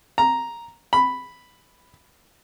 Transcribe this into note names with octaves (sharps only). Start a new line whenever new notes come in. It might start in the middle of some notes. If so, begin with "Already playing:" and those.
A#5
B5